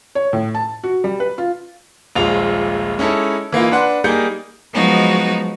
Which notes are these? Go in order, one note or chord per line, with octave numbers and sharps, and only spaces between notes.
C#5
A2
A5
F#4
G3
B4
F4
D#1 A#1 G#3 F4 F7
G#3 C#4 D#4 E4 A4
E3 A#3 D#4 F4
D4 B4 F#5 C6
G3 A#3 D#4 G#4 G6 C#7
F3 F#3 G#3 B3 D#4 F#4